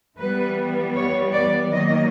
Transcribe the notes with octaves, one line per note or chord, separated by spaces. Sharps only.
E3 G3 B3 B4
C#5
D5
D#3 F#3 A#3 D#5